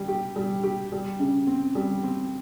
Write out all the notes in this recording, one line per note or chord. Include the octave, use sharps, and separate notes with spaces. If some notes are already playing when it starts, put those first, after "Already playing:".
Already playing: G3
G4
G3
G4
G3
C#3
C4
G3
C4